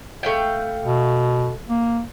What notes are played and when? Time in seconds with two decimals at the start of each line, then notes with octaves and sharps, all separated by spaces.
0.23 A3 F5 G5
0.85 B2
1.69 A#3